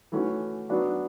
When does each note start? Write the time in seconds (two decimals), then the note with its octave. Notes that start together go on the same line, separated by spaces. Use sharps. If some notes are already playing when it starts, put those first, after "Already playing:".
0.12 E3 A3 C#4 F#4
0.69 F#3 B3 D4 F#4